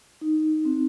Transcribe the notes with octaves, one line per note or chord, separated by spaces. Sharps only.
D#4
C4